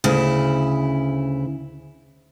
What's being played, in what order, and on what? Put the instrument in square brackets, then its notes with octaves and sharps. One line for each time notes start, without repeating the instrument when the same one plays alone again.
[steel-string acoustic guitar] D2 C#3 E4